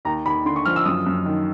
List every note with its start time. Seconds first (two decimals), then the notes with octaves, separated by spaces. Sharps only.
0.05 D#2 A#5
0.26 D#2 B5
0.45 D3 C6
0.56 C#6
0.65 F3 F6
0.76 E6
0.85 F#2 D#6
1.06 F#2
1.26 D#3